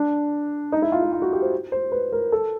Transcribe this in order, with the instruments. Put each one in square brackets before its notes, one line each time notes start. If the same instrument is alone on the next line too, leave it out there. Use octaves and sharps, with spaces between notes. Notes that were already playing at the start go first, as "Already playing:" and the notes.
Already playing: [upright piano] D4
D#4
E4
F4
E4
F4
F#4
G4
C5
C5
B4
A#4
A4